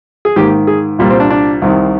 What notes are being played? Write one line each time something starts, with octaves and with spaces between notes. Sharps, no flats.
G#4
G#2 D#3 A#3 G4
G#4
C2 A#2 G3
C4
D4
D4
C2 C3 D#3